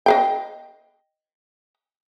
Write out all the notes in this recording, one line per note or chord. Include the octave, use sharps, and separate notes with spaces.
D#5 F5 G5